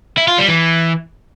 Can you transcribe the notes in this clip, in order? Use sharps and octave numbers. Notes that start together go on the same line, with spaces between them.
E4
F4
G3
E3